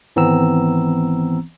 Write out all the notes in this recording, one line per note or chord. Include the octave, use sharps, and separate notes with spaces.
G#1 E3 B3 C4 A#5 E6